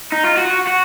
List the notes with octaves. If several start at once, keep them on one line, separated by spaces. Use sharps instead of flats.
D#4
F4
F#4
F#4